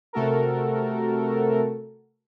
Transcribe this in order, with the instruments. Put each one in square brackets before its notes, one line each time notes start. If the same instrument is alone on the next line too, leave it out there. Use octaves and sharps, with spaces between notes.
[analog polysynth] C3 A3 F#4 A4 A#4